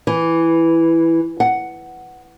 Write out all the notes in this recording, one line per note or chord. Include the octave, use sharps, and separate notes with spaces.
E3
F#5